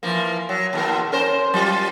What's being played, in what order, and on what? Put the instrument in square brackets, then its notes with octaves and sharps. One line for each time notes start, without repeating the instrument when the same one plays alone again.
[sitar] E3 F3 A#3
F#3
D#2 B2 A#4
C#4 A#4 C5
F#3 F4